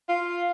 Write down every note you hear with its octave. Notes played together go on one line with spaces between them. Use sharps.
F4